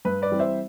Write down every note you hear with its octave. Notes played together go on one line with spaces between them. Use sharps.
G2 B4
B4 D5
E3 G3 C4
C5 E5